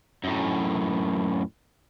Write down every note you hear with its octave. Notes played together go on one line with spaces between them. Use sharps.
F#2 A2